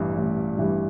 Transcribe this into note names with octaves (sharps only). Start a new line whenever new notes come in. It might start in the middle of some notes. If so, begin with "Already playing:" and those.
Already playing: A1 G2 E3 G3
A1
G2 E3 G3